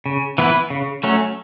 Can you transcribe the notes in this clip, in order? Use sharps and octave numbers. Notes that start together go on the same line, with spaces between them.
C#3
E3 B3 E4 B4
C#3
F#3 A3 C#4